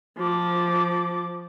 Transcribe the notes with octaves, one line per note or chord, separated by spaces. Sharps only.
F3 D6